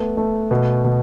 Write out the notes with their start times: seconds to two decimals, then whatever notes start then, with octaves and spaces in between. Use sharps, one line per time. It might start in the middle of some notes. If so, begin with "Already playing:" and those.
Already playing: A3 B3
0.17 A3
0.51 B2
0.84 B2